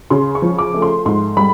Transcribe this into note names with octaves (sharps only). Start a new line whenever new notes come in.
C#3 C6
C#6
F3
D6
A3
C6
G#2 C6
G3 B5